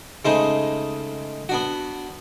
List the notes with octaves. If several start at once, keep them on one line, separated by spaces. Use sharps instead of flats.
C#3 G#3 A3 D#4 C5
B3 D4 F#4